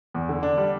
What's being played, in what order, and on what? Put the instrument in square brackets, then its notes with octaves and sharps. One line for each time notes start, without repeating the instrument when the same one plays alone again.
[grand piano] E2
D3
D4
G3